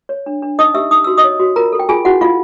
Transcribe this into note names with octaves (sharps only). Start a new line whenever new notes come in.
C#5
D4
D4
D#4 D#5 D#6
G4 E5 E6
D#4 D#6
F#4 E6
D#5 D#6
C#5
F#4
F4 A#4 A#5
A4
G5
F4 G#4 G#5
E4 F#4 F#5
E4 F4 F5